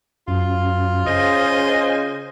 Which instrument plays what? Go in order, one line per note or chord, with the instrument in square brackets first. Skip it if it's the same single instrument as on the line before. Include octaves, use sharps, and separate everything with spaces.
[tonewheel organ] F#2 [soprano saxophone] F4
[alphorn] C#3 [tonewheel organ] C5 G#5 [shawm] D#5